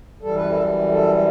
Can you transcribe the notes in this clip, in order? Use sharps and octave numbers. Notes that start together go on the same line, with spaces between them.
F#2 E3 G3 A4
B4
A4
A4